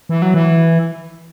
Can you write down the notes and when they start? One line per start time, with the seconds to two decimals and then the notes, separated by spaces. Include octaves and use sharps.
0.09 E3
0.22 F#3
0.34 E3